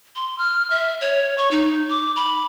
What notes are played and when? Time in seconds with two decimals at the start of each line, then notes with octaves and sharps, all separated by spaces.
0.16 C6
0.38 F6
0.70 E5
1.01 C#5
1.38 C#6
1.51 D#4
1.90 D6
2.16 B5